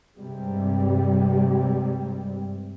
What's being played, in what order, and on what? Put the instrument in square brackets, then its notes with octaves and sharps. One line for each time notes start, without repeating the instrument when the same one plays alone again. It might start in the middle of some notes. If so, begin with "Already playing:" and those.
[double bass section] G2 C3 G3 G#3